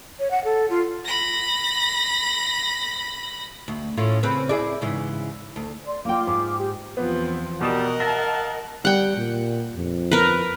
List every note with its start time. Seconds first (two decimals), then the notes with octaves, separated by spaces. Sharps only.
0.19 C#5
0.31 F#5
0.44 A4
0.70 F4
1.05 B5 A#6
3.68 D2
3.97 A2 C#4 F4
4.23 C#3 C4 B4
4.49 E4 G#4 D5
4.81 G#2 C#3 E3
5.56 D2
5.87 D5 C6
6.05 A#3 F4 G5 D6
6.27 G#2
6.58 G4
6.97 E2 F3 B3 C4
7.61 B2 G3 A#4 D#5 F#5 D#6 E7
8.00 E5 F5 A5 A#6
8.85 G3 F#5 G5
9.17 A#2
9.76 F2
10.12 A#4 B4